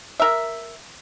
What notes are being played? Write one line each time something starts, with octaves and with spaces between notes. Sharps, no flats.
A#4 E5